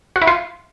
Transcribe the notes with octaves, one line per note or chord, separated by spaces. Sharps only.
F#4
E4
F4